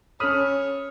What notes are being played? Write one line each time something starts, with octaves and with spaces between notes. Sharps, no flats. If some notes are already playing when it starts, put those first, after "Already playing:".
C#4 A4 C#5 B5 D#6 F6 D#7